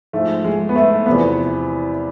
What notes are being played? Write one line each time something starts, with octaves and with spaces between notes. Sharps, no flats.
G#2 F3 A3
G#3
B3
A3
E2 C3 F3 B3